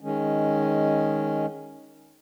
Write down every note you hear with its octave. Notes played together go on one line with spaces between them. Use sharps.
D#3 G#3 C#4